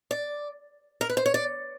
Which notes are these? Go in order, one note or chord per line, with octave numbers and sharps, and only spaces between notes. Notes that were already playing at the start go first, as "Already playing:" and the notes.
D5
A#4
B4
C5
C#5
D5